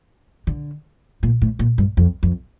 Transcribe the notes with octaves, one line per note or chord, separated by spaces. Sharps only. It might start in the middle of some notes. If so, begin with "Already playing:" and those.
D3
A#2
A2
A#2
G2
F2
F2